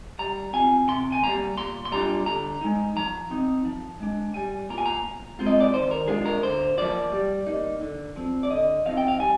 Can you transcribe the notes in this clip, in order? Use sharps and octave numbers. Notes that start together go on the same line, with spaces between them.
G3 A#5
C4 F4 G#5
C3 C6
G#5
G3 A#3 A#5
A#2 C6
C6
G3 D4 F4 A#5
D3 A#5
G#3 D#4
F3 A#5
C4 D#4
F3
G#3 D4
G3 G#5
A#3 F4 A#5
G#5
A#5
A#2
G#3 C4 F4
D#5
D5
D#3 C5
A#4
G#3 D4 F4 G#4
A#4
D3 C5
F3 A#3 F4 D5
G3
A#3 D#4
D3
F3 C4
D5
D3 D#5
F3 C4 D#4 F5
G5
F5
G3 G#5